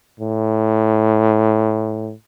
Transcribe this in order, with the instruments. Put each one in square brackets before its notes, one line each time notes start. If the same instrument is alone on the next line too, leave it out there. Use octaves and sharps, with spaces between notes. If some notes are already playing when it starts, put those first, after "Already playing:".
[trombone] A2